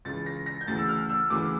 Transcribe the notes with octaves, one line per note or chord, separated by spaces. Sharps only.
C#2 C#3 E3 A6
A#6
A#6
G6
D2 C#3 E3 A6
E6
F6
E6
D2 C#3 E3 D6